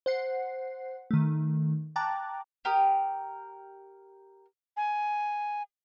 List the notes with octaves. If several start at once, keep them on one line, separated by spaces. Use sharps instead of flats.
C5 F#5 C7
D#3 A3
G5 A5 A#5 D6 F#6 A6
G4 A#4 D#6
G#5